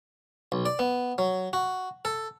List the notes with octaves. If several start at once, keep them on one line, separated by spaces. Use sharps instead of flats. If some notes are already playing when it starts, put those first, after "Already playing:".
B1
D5
B3
F#3
F#4
A4